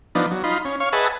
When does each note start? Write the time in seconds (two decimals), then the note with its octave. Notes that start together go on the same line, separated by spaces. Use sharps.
0.15 F3 B3 D4 D#4
0.31 F#3
0.44 D#4 F4 B5 C6
0.65 C#4
0.80 C#5 F5 C#6
0.93 G#4 B4 D#5 E5 F#5 A5